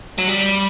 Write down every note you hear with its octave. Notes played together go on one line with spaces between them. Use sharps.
F#3
G3